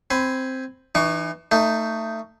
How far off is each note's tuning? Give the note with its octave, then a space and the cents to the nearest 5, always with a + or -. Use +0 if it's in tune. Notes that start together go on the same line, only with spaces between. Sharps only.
C4 +0 G#5 +0 B5 +15
E3 +0 D#4 -40 C#6 +20
A3 +25 D#4 +0